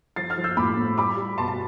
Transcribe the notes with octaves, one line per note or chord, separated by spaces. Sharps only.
F3 A6 C7
F6 A6
F3
E6 G6
A2 B5 D6
A2
G3 B5 D6
G3
B2 A5 C6
A5